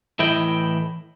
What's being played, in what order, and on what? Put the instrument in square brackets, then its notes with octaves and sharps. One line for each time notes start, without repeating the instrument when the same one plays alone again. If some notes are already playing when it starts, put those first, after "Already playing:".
[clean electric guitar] A2 E3 E4 D#5 G5